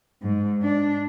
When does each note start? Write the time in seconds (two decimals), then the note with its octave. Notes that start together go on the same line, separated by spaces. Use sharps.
0.23 G#2
0.63 D4